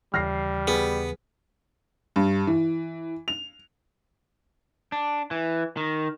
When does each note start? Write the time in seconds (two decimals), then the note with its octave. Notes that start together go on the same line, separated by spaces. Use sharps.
0.14 D#2 C#3 E3 G3 F6 A#6 C7
0.68 B3 G#4
2.16 G2
2.47 E3
3.28 F7
4.92 D4
5.31 E3
5.77 D#3